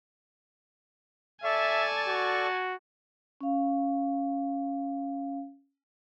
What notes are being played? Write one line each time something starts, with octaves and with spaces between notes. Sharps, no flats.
A4 D5 E5 G#5 A5 C#6
F#4
C#4 F5